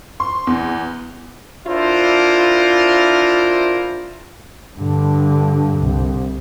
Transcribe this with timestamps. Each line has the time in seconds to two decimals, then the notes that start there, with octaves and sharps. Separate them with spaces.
0.20 C6
0.47 E2
1.67 D4 E4 F4 A#4 C5
4.77 G2 D3
5.79 C2